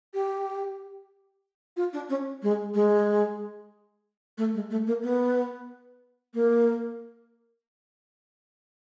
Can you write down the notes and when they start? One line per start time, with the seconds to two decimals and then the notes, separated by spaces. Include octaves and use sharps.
0.14 G4
1.76 F4
1.93 D4
2.09 C#4
2.42 G#3
2.74 G#3
4.38 A3
4.54 G#3
4.70 A3
4.87 A#3
5.03 B3
6.34 A#3